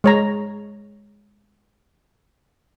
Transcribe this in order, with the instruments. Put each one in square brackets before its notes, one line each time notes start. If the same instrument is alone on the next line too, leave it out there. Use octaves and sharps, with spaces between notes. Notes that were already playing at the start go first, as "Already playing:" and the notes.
[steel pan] G#3 C#5 A#5